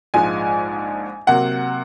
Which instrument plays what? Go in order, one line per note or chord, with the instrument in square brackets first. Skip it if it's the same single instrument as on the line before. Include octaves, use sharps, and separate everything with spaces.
[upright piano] A#1 G#2 F3 G#3 G#5
C3 F#3 A#3 F#5